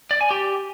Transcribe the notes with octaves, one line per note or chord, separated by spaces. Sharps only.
D5
G#5
G4